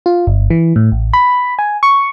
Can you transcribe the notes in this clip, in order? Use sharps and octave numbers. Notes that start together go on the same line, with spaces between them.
F4
G1
E3
A2
A1
B5
G#5
C#6